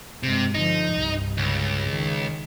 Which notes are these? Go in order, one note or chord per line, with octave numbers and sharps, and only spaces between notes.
G2 C3 G#3
D3 F3 D#4
C2 G2
C#2
D#3